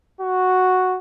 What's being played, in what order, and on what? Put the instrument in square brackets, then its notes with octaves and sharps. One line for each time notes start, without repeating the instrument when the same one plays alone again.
[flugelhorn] F#4